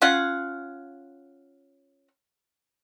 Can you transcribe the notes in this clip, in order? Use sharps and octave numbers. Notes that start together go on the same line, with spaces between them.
C#4 F4 F5 F#5